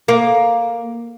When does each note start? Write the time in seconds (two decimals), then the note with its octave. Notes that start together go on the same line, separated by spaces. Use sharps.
0.08 A#3